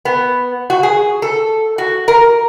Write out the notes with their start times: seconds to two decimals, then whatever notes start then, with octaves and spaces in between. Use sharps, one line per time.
0.05 B3
0.70 F#4
0.83 G#4
1.22 A4
1.78 F#4
2.08 A#4